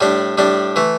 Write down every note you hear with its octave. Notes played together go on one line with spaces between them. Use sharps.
A2 G3 D4
A2 G3 D4
E3 A3